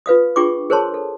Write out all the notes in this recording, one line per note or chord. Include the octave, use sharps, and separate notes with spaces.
F4 B4 F5 D#6
D4 F4 G#4 G5 C#6 D6
G#4 A#4 C5 C#5 A5 C6
A4